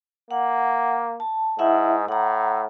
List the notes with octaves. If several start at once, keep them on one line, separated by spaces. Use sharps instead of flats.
A#3 F#5
A5
G#2 E4 E5 F#5
A2 F#5 A#5